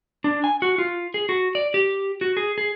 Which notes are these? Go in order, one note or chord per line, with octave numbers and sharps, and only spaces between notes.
D4
G#5
F#4
F4
G#4
F#4
D5
G4
F#4
G#4
G#4